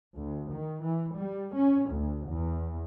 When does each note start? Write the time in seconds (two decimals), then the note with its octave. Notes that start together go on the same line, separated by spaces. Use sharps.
0.15 D2
0.53 D#3
0.84 E3
1.16 G3
1.54 C#4
1.91 D2
2.28 E2